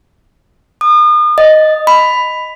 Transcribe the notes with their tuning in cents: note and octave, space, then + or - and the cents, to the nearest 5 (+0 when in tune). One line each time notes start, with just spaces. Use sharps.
D#6 -40
D#5 +0
B5 +10